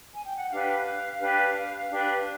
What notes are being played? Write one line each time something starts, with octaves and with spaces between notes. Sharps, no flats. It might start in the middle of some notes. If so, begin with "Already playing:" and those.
G#5
G5
F#5
D4 G4 B4 F5
D4 G4 B4
D4 G4 B4